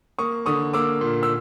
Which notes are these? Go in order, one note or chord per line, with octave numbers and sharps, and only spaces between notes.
A#3 C#6 D#6
D3 C#6 D#6
A#3 D6 E6
A#2
E6